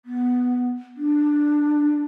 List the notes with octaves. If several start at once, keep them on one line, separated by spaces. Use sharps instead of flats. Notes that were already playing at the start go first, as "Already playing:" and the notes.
B3
D4